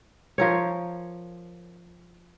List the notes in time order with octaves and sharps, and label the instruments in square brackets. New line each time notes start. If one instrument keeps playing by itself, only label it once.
[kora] F3 A#4 C#5